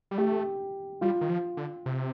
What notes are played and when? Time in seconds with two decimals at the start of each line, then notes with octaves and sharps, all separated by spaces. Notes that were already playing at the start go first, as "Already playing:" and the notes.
0.11 G3
0.18 A3 G4
1.01 G3 F4
1.21 D#3
1.29 F3
1.57 D3
1.86 C3